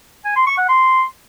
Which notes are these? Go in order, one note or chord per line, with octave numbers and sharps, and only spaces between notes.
G#5
C6
C#6
F#5
C6